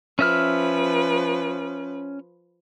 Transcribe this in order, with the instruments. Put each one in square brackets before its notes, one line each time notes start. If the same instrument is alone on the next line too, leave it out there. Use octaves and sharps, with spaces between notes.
[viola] F3 B4 [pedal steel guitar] C#4 E5 F6